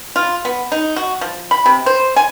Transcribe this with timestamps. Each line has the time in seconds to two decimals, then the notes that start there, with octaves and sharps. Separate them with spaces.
0.16 F4
0.45 B3
0.72 D#4
0.96 F#4
1.21 F3
1.51 B5
1.66 C3
1.86 C5
2.16 G#5